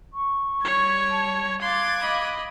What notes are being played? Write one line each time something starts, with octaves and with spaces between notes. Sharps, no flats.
C#6
G3 C#5 G#6
A5
F5 C6 D6 F#6 G#6 A6
D#5 B5